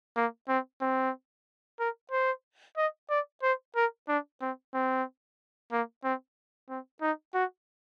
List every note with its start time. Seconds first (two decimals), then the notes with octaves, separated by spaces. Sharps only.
0.16 A#3
0.48 C4
0.81 C4
1.79 A#4
2.12 C5
2.77 D#5
3.10 D5
3.43 C5
3.76 A#4
4.08 D4
4.41 C4
4.74 C4
5.72 A#3
6.04 C4
6.69 C4
7.01 D#4
7.34 F#4